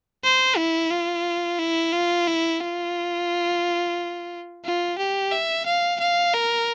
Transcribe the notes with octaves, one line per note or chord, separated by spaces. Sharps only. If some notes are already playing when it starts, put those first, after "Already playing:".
C5
E4
F4
E4
F4
E4
F4
F4
G4
E5
F5
F5
A#4